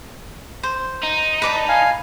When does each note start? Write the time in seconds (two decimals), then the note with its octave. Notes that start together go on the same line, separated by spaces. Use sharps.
0.63 C5
1.03 D#4
1.42 B4 D5 A5
1.68 F5 G#5